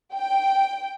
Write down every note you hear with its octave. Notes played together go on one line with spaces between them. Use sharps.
G5